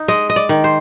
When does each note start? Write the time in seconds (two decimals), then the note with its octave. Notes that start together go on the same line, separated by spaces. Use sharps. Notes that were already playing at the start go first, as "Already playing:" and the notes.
Already playing: D#4
0.08 G#3 D#5
0.30 D#5
0.36 D5
0.49 D#3
0.64 C5